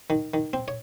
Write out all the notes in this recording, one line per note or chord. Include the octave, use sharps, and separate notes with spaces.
D#3
D#3
C4
C#5